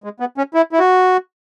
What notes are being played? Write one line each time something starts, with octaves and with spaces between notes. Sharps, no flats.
G#3
B3
C#4
E4
E4
F#4